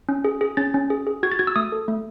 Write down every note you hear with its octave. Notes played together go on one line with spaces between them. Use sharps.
C#4
G#4
G#4
C#4 A6
C#4
G#4
G#4
F#4 G#6
A6
F#4 G#6
E6
A3 D#6
A4
A3